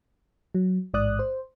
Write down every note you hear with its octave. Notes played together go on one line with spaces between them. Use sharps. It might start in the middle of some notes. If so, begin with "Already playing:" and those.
F#3
A1 G#2 D5 D#6 F#6
C5